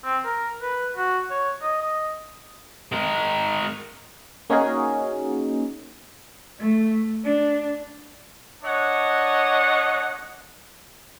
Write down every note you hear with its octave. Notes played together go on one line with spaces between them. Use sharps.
C4
A#4
B4
F#4
C#5
D#5
D#5
G#3 A#4
A#3 C#4 D#4 F#4 G#4 A#4
A3
D4
D4 C#5 D#5 F#5